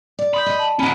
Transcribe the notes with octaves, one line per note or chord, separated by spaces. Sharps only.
D5
B5 C6 D#6 G6
D#5
A5
C#4 D#4 A4 F#5 A#5 B5